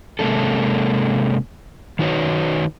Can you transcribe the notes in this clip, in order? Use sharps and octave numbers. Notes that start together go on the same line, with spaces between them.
C3 G#3 A#3 C#4 A4
D#3 D#4 F#4 B4 C#5